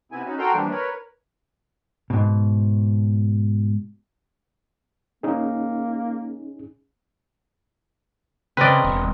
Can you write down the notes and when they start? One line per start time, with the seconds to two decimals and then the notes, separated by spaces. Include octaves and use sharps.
0.12 C3 B3 C4 E4 G#5
0.25 C#4 D#4 F#4
0.39 F#4 A4 A#4 G5 A#5 C6
0.54 E3 F3 G3 A#3 D4
0.70 A#4 B4 C#5
2.10 G#2 B2
5.23 A#3 C#4 D#4 G#4
8.57 C#3 C4 A#4 B4 D5 D#5
8.84 E1